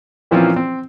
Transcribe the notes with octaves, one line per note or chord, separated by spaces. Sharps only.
A#2 E3 F3 C4 C#4 F4
C4